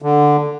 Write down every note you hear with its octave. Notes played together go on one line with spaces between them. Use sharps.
D3